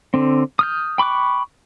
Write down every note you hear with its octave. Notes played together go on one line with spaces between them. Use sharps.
D3 C4
D#6 F6 G6
G5 B5 C#6 D6 F#6